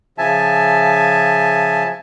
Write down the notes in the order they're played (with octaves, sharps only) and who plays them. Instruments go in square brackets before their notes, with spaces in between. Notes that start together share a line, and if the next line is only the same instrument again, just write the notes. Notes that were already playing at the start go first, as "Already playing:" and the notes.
[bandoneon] C#3 F3 E5 G#5 A5